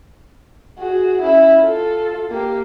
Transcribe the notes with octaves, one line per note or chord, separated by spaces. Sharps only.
F#4 G#4
C#4 E4
F4 A4
A#3 G4